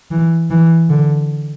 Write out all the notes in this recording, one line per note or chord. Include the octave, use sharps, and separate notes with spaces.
E3
E3
D3